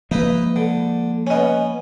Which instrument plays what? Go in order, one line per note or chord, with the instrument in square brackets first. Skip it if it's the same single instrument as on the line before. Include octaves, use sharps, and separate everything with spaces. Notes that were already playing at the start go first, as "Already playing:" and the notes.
[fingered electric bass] F3 G#3 A#3 [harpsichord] D#4 E4 B4
[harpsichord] D3
[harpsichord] B3 C#4 [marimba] C#5 D#5